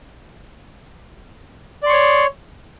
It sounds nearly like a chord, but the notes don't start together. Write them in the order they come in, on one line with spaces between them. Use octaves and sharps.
D5 C6 C#6 C#5